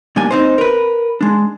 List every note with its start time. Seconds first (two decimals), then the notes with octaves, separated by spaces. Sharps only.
0.16 A#2 G3 A#3 D4 G#5
0.31 C4 D#4 C5
0.58 A#4 B4
1.21 G#3 D4